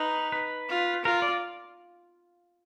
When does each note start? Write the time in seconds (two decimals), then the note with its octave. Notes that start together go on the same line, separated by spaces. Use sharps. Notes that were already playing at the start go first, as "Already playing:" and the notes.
Already playing: D#4 B4
0.32 B4
0.69 F4
1.04 F4 A#4
1.22 D5